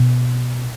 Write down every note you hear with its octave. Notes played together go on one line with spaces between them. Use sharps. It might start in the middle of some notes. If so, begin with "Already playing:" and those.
Already playing: B2